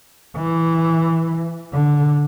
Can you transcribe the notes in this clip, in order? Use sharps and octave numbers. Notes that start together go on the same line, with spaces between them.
E3
D3